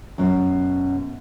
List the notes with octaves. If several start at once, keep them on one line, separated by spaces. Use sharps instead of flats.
F#2 B2